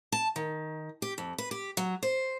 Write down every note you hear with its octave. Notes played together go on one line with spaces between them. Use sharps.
A5
D#3
G4
F2
B4
G4
F#3
C5